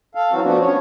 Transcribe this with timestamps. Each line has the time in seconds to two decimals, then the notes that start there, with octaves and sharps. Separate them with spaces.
0.15 A4 F5
0.32 E3 F#3 C4 F#4
0.44 F3 A3 B3 D4 F#4
0.61 B3 C#4 C#5